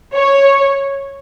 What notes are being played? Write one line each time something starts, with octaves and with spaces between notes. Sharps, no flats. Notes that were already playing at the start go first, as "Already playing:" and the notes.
C#5